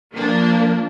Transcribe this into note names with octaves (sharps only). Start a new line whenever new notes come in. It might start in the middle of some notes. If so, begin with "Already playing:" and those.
F3 A#3 D4